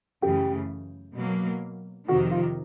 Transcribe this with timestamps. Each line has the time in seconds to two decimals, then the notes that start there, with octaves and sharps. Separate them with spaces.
0.21 F#2 C#3 E3 A3 G4
1.14 B2 F#3 A#3
2.08 F2 C3 D#3 F#4
2.31 F4